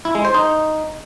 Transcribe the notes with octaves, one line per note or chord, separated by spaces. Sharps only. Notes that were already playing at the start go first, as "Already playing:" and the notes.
E4
G#3
C5
D#4